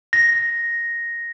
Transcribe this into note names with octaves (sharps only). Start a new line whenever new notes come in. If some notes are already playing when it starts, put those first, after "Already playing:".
A#6